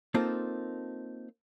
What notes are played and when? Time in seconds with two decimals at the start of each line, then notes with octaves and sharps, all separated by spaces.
0.14 A#3 C4 D#4 F4 A4